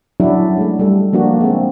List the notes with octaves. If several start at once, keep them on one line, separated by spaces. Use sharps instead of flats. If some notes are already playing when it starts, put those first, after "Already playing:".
F#3 C#4 D4 E4 F#4
G#3 A3
G3 A4
F3 A#3 D4 F#4
G#3 C4